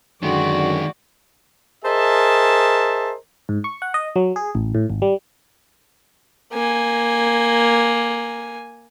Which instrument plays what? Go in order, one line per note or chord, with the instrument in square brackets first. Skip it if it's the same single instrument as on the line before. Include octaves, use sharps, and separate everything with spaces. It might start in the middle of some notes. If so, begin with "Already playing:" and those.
[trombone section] F#2 D3 [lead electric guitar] D#3 G#3 [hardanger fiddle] F#4 D5
[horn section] G#4 A#4 C5 D#5 E5 A5
[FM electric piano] G#2
C#6
F#5
D#5
F#3
G#4
A1
A2
G#1
G3
[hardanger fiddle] A#3 G#5